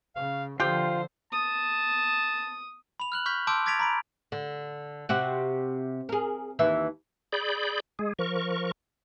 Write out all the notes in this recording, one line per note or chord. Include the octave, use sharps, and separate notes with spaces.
C#3 F5
D3 F3 F4 G4 C5 G5
A5 D#6
B5 F7
F6 F#6 F#7
C#6 F6 G6 B6
A5 C6 D6 E6 G6 D7
D6 G#6 A6 B6 D7 F7
A#5 B5 D7
D3
C3 C4 F#4
G#4 A#4
D#2 E3 E5
G#4 D5 B5 G6
G#3 G#4
F3 A#4 C#6